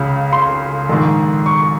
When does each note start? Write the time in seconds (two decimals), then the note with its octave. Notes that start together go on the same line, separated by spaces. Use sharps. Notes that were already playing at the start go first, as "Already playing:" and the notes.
Already playing: C#2 C#3
0.33 C6
0.89 A#1 G#2 D#3
1.46 C#6